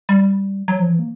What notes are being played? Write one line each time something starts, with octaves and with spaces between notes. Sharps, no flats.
G3
F#3
F3
E3
A#3